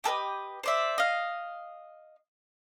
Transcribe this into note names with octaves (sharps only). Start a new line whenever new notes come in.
G4 A4 B4 D#5
C5 D5 E5
D#5 F5